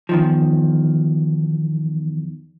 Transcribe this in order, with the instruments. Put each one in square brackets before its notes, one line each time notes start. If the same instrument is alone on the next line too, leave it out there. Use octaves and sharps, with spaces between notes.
[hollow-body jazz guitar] E2 D#3 F3